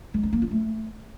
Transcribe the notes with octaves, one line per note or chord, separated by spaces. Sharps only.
G#3
D#4
A#3
F4
A3